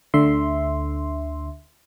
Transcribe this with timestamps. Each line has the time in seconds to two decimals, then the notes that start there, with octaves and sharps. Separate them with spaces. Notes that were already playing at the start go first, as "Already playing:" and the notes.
0.14 D2 D3 E5 C6